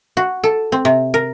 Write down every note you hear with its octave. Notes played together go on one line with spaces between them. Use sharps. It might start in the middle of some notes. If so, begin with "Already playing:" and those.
F#4
A4
C4
C3
A#4